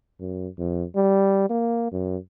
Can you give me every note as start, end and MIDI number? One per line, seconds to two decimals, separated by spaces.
0.20 0.48 42
0.58 0.84 41
0.96 1.47 55
1.50 1.88 58
1.92 2.17 42